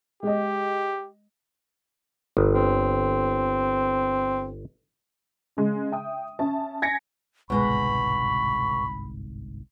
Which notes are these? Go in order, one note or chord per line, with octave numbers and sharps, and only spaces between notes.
G#3 G4 D#5
G1
C4
C#3 G#3
E5 G5 D#6
C#4 E5 A5
G#5 G#6 A#6 B6 C#7
G1 C2 G#2 B2 G#3 B4 B5 C#6